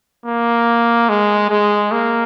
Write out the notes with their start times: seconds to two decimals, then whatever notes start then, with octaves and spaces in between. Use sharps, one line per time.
0.26 A#3
1.09 G#3
1.50 G#3
1.92 A#3